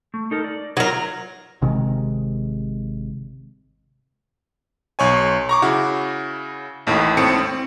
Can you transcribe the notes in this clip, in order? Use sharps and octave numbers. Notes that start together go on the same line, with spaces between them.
A3
D#4 A4 A#4
D5
F#3 D#4 F4 A#4
G#1 C3 D#3 G#3
B1 C#5 G#5
A#5 C#6 D6
C#3 E4 F#4
A1 D#2 A2
G#1 A2 C4 C#7
C4